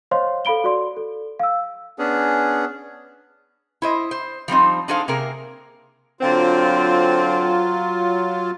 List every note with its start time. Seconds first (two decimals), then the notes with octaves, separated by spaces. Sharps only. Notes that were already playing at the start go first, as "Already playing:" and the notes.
0.11 C5 C#5 D#5 F5 C6
0.45 A4 F5 B5 D7 G7
0.64 F#4 D5 C6
0.96 A4
1.39 F5 E6
1.99 B3 C#4 D4 G#4
3.82 E4 C5 D#5
4.11 C5
4.48 F3 G3 C4 D#4
4.88 D4 D#4 G#4 A4 C5 F5
5.08 C3 A#3 G#4 A#4
6.21 D3 F#3 C4 F4